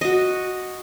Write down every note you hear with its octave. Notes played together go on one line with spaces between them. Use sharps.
F#4 D#5